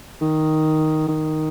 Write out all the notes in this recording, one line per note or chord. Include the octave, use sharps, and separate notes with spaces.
D#3
D#3